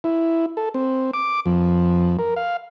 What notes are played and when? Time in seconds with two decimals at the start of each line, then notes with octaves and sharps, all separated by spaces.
0.04 E4
0.57 A4
0.74 C4
1.14 D6
1.46 F2
2.19 A#4
2.36 F5